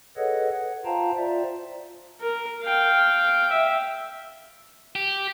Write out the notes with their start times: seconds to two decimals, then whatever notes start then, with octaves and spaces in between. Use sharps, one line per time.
0.17 G#4 A4 B4 C#5 D#5 F#5
0.51 F#5
0.85 F4 C5 F5 G5 A5 A#5
1.17 F4 C5 D5 E5
2.21 A#4
2.63 F5 G5
3.50 E5
4.95 G4